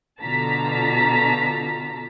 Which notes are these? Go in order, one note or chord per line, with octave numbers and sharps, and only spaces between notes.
B2 D3 F4 A5 A#5 B6